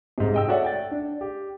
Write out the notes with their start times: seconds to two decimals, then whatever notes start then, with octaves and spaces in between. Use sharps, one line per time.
0.18 G#2 C3
0.34 D#5 G5 E6
0.48 F#4 A4 C#5 D5 E5 F#5
0.64 G5 A6
0.91 D4
1.21 G4